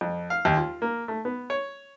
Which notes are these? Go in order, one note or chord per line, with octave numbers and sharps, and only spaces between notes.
F2
F5
D#2
F4
A#3
A3
B3
C#5